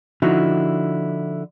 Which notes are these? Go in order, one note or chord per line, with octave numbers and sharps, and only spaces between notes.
D3 F3 D#4 E4 F#4